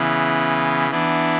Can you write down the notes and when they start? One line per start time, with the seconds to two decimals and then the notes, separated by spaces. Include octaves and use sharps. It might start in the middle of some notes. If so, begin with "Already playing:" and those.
Already playing: C#3 E3 B3
0.91 E3 B3 D4